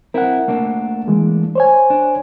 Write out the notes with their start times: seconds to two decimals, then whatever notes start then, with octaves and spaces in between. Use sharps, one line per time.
0.14 C4 E4 A#4 F#5
0.48 A3 A#3 D4
1.08 E3 G#3
1.55 C5 C#5 G#5
1.90 D4